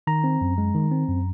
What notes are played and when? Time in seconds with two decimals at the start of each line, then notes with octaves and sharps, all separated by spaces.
0.07 D#3 A#5
0.24 C4
0.41 F#2
0.58 G#3
0.74 D#3
0.92 C4
1.08 F#2